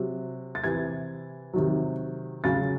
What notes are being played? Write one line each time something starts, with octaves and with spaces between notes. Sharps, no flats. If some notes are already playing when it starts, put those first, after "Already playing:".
Already playing: C3 F#3
A6
C3 E3 G#6
C3 D#3 F#3
C#3 F#3 A6